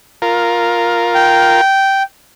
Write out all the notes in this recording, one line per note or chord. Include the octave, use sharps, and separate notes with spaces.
F4 A#4
G5